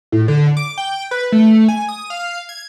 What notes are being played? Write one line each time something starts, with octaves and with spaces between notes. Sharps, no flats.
A2
D3
D6
G5
B4
A3
G#5
D#6
F5
G#6